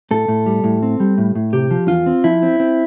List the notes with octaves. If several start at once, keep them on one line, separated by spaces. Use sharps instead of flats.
A2 A4
A2
G3
A2
C4
G3
A2
A2
C3 G4
F3
E2 F4
C4
F3 E4
C4
C4